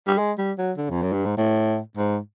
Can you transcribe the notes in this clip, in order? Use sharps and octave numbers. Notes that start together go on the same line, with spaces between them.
G3
G#3
G3
F#3
D3
F2
F#2
G2
G#2
A2
G#2